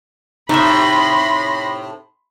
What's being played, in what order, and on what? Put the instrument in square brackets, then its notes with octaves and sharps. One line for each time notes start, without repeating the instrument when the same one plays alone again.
[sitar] A2 C3 [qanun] D#4 E5 [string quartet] B5 C6 A#6